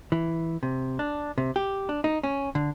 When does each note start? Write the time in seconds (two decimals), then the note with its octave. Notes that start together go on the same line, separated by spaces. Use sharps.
0.12 E3
0.63 C3
0.99 D4
1.38 C3
1.56 G4
1.89 D4
2.04 D#4
2.23 C#4
2.55 D3